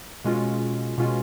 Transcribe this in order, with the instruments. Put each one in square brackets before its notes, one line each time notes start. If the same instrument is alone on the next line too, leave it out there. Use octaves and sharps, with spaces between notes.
[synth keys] B2 G#3 C#4 F4
B2 G#3 C#4 F4